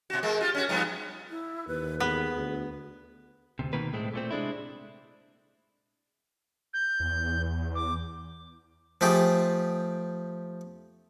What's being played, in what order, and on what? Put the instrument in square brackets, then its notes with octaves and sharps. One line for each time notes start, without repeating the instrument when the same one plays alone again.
[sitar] B2 F#4
G#3 A#3
F4 G4
C#4 F#4
G2 F3 B3
[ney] E4
[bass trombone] D#2 [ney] B4
[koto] B3 [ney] G#4
[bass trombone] D2
[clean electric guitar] D2 C3
B2 D#3 A#3 B4
A2 G#3 A3 C4
A#2 A3 C4
C3 G#3 D4 E4
[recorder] G6
[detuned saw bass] E2
[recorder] D6
[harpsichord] F3 A3 G4 G#4